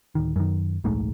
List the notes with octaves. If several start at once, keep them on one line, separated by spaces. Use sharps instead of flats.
D1 D#3
F#2 D#3
D1 A#1 G#2 A3